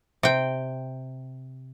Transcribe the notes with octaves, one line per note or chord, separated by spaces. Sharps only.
C3 G5